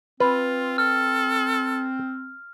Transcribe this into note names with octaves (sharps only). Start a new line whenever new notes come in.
C4 F4 B4
A4 F6